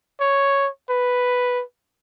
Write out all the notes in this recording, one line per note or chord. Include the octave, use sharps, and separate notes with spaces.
C#5
B4